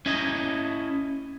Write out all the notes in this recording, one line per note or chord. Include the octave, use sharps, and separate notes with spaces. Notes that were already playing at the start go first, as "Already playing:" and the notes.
C#4 E4 D#5